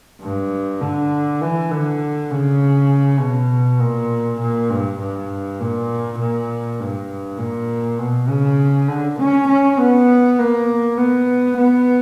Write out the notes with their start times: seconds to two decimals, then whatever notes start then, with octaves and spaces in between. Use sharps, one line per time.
0.21 G2
0.81 D3
1.41 E3
1.71 D3
2.31 C#3
3.20 B2
3.80 A#2
4.40 A#2
4.70 G2
4.99 G2
5.60 A#2
6.19 A#2
6.80 G2
7.39 A#2
7.98 B2
8.29 C#3
8.88 D3
9.19 C#4
9.48 C#4
9.78 B3
10.39 A#3
10.98 B3
11.57 B3